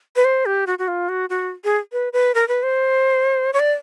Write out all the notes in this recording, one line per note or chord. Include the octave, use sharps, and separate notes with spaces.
B4
C5
G4
F#4
F#4
F4
F#4
F#4
G#4
B4
B4
A#4
B4
C5
C#5
D5